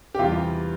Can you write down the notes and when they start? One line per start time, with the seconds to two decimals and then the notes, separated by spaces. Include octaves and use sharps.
0.15 G4
0.19 E2 C3 G3 F4